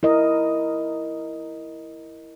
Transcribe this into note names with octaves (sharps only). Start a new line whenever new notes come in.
E4 A#4 D#5